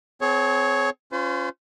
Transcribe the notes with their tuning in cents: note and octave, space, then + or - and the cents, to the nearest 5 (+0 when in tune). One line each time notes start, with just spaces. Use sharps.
C4 -25 G#4 +40 C#5 +0
C#4 +0 F4 +0 C5 -40